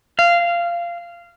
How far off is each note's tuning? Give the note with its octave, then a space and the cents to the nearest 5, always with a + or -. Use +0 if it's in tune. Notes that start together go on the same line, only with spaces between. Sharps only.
F5 -15